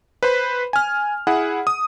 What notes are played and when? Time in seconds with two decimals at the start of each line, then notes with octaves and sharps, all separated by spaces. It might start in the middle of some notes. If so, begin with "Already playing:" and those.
0.23 B4 C5 B5
0.73 G#5 F6
1.27 E4 G#4 F#5
1.67 D#6